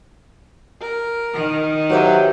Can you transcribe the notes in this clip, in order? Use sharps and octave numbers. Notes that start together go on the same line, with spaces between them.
A#4
D#3
F#3 G4 B4 C5 E5